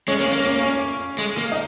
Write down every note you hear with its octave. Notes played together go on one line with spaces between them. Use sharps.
G#3 C#4
A#3
C#4
A#3
C#4
C#4
G#3
A#3
D#4